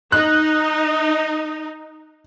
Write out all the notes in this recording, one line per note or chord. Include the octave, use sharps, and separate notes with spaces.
D#4 F#6